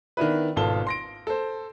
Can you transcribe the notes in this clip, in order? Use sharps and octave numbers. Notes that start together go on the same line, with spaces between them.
D#3 B3 D4 E4 B4
G#1 B2 F4 A4 A5 G7
C6 A#6 D7
A4 C5